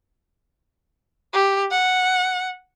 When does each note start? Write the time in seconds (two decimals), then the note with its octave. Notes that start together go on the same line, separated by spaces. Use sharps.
1.34 G4
1.71 F#5